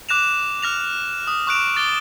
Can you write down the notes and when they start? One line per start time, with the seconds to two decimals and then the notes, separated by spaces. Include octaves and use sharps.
0.09 D6 F#6 A#6 E7 F7
0.62 F6 A#6 F7
1.27 D#6
1.47 C#6 F#6 D7 F7
1.76 D6 A6 G7